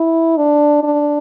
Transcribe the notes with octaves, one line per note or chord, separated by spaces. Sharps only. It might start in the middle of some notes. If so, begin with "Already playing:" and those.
Already playing: E4
D4
D4